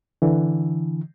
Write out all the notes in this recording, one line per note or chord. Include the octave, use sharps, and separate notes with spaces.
D3 E3